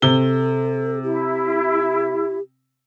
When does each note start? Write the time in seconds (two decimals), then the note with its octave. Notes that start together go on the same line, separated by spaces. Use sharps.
0.02 C3 A4 G7
1.03 E4 G4